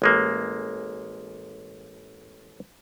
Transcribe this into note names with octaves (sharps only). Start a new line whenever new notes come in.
A1 G#3 A#3